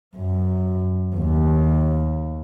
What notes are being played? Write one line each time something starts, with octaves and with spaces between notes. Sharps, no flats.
F#2
D#2